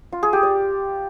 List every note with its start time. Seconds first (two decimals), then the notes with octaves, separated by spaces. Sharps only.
0.12 F4
0.23 G#4
0.33 G4
0.43 D5